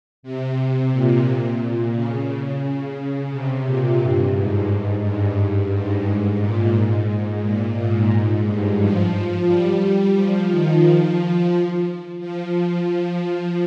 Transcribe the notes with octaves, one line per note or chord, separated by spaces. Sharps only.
C3
A#2
C#3
C3
A#2
G2
G#2
G2
G#2
G#2
A#2
G#2
A#2
G#2
G2
F3
G3
F3
D#3
F3
F3
F3